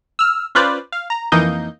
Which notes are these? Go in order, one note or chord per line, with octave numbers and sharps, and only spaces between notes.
E6 F6
C#4 F4 B4 C5 D5
F5
A#5
F2 E3 A#3 D#4 D#5 G6